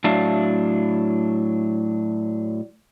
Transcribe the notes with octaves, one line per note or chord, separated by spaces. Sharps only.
A2 F#3 D4 E5 F5 A5